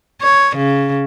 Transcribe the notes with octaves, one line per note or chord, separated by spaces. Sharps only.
C#5
C#3